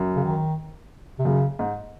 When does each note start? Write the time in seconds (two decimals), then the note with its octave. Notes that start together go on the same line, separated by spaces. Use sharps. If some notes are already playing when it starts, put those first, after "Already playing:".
Already playing: F#2
0.16 C#3
0.24 D#3
1.19 C3
1.25 F#2 C#3
1.59 G#2